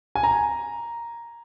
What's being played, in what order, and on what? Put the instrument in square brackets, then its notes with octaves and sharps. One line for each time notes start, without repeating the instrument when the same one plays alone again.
[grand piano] G#5
A#5